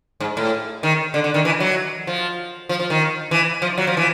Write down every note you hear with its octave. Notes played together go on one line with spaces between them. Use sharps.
G#2
A2
D#3
D3
D3
D#3
E3
F#3
F3
F3
F3
D#3
E3
F3
F#3
F3
E3